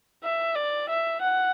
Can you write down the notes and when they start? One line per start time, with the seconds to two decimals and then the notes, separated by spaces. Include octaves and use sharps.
0.23 E5
0.55 D5
0.89 E5
1.21 F#5